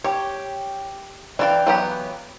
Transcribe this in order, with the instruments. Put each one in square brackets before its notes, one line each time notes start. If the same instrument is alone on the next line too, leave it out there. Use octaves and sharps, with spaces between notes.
[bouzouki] G4 [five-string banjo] C#5
[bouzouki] E3 F5 G5 [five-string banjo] D4 D5
[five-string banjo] F#3 B3 G4